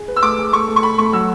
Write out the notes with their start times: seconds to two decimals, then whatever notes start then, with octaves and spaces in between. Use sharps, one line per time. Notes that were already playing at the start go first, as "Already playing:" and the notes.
Already playing: G#4
0.08 B4
0.16 E6
0.22 A3 D6
0.38 G#4
0.53 A3 C#6
0.68 A3
0.76 C#6
0.83 A4 B5
0.98 A3 C#6
1.13 F#3 E6